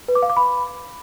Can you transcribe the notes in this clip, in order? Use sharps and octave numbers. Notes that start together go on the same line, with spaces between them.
B4
D6
F5
D6
B5